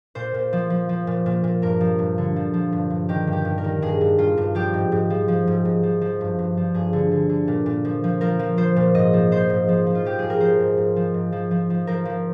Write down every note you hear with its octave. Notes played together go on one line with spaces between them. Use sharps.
A#2 C5
A#2
F3
F3
F3
A#2
A#2
A#2
G2 A#4
F3
G2
D3
F3
F3
G2
G2
D#3 G4
G2
G4
G2
A#4
D#3
G2 G#4
G2
G2 F4
G2
F3 G4
G#2
G#2
F3
F3
G#2
G#2
F3
F3
G2
G2
F3
G2 G#4
D3
D3
D3
A#2
A#2
F3
F3
F3 A#4
F3
F3 C5
A#2
G#2 D#5
F3
F3 C5
G#2
F3
F3
F4
F3 G4
G#2 G#4
A#4
F3 C5
G#2
G#2
F3
G#2
F3
F3
F3
F3 A#4
F3